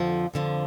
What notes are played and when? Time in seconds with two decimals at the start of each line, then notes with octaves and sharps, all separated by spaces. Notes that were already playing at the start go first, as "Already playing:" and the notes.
Already playing: F2 D3 F3
0.34 F2 D3 F3